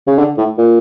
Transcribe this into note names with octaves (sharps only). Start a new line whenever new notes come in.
C#3
D3
A2
A#2